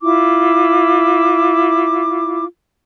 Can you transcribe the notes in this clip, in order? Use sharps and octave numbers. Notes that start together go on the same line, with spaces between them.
E4 F4 D6